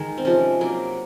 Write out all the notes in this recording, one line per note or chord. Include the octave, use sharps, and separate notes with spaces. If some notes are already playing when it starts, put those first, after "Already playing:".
Already playing: D#3 G#3 D#4
C4
C3 F3 G#3 C#4
C3 F#3 A#3